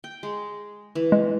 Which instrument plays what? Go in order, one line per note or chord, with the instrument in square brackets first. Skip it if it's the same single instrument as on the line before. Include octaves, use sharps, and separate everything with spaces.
[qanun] G5
G#3
E3
[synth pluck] G#3